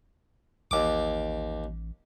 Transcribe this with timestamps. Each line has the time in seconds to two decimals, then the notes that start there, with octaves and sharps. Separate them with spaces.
0.71 A1 D#2 D6